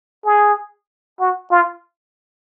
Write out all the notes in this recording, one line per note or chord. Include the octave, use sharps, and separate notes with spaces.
G#4
F#4
F4